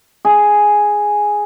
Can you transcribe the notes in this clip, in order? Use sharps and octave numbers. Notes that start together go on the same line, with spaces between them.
G#4